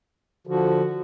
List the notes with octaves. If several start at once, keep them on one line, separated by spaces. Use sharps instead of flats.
D3 F3 F#4